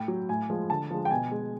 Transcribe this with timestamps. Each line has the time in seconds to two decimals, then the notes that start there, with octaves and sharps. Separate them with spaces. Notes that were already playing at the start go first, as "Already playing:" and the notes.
Already playing: A2 G5
0.08 F#3
0.29 A2 G#5
0.50 F3 G#3
0.70 D3 A5
0.91 F3 G#3
1.05 G5
1.11 B2 G#5
1.31 G#3